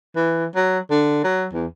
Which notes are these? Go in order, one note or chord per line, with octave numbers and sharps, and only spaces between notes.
E3
F#3
D3
F#3
E2